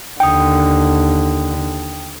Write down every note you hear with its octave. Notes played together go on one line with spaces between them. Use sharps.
D#2 D3 G5 D#6